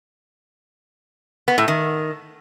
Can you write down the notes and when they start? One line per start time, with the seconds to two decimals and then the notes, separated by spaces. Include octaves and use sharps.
1.48 B3
1.58 A2
1.68 D#3